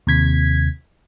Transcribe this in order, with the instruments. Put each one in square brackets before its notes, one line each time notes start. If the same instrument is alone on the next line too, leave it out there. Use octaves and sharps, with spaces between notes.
[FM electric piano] D#2 C3 G#6 B6